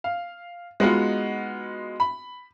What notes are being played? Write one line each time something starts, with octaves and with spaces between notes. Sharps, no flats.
F5
G#3 B3 D#4 F4 F#4
B5